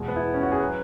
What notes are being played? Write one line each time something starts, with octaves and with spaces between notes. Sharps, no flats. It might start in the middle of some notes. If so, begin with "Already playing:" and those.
Already playing: E2 B2 G#3
B3
E4
C#4
F#4
G#4
F#3 B4